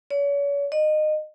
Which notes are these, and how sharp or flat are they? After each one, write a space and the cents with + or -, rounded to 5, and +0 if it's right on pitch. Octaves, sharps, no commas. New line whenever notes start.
C#5 +40
D#5 -25